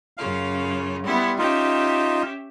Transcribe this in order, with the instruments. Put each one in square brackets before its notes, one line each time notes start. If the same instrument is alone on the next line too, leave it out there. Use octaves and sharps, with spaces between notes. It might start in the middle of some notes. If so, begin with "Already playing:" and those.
[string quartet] F#2 C#3 F4 [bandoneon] F5
[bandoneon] G3 [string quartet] B3 E4 C6
[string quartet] C#4 G4 E5 [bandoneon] D#4 F4